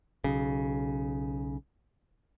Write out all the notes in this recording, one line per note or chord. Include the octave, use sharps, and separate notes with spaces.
B1 C#3